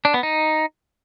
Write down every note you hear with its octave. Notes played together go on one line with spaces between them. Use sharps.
D4
B3
D#4